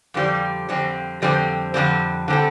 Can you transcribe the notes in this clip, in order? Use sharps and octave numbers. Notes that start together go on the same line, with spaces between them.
F2 D3 G3 C4
F2 D3 G3 C4
F2 D3 G3 C4
F2 D3 G3 C4
D3 G3 C4 A4